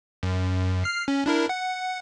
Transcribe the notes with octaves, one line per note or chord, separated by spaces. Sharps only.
F#2
F6 C7
C#4
D4 E4 A#4
F#5